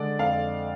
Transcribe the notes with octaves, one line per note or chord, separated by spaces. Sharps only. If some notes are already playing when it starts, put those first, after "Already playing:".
Already playing: D3 G#3 D5
F2 F5